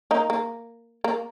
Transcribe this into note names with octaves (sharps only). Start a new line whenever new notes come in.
A#3 D#4
A#3
A#3